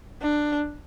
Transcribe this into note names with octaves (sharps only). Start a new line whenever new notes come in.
D4